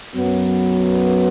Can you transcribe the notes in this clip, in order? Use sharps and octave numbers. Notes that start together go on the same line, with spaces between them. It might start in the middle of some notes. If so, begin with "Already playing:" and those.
F#2 F#3 B3